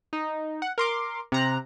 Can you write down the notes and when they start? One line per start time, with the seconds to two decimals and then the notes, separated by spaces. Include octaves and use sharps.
0.13 D#4
0.62 F#5
0.78 A#4 C6 D6
1.32 C3 A#5 F#6